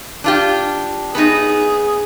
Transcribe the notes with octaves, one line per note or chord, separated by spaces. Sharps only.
D4 F4 G4
B3 D#4 G#4